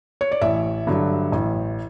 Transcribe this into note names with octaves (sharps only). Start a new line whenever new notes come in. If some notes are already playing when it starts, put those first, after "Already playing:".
C#5
D5
A1 E5
G2 D3 F#3
A1